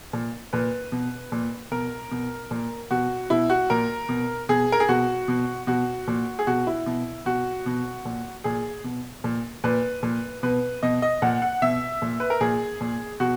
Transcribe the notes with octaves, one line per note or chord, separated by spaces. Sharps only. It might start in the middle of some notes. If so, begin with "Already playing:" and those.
A#2
A#2 B4
B2
A#2
B2 A#4
B2
A#2
B2 F#4
B2 E4
F#4
A#2 A#4
B2
B2 G#4
A#4
G#4
B2 F#4
B2
B2 F#4
A#2
G#4
B2 F#4
E4
B2
B2 F#4
B2
A#2
A#2 G#4
B2
A#2
A#2 B4
A#2
B2 B4
B2 D#5
D#5
A#2 F#5
F#5
B2 E5
A#2
B4
A#4
A#2 G#4
A#2
B2 F#4